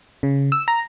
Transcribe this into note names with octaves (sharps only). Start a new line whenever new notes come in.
C#3
E6
A#5